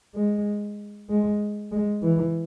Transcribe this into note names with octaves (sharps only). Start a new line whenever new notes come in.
G#3
G#3
G#3
E3